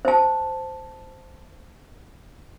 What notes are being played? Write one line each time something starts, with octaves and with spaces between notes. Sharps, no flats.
C5 A5